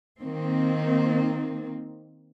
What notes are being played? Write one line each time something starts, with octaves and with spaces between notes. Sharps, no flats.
D#3 A#3 C4